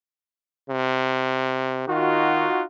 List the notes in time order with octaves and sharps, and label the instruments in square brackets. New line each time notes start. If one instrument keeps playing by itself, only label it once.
[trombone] C3
[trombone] D#3 [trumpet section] D#4 F4 F#4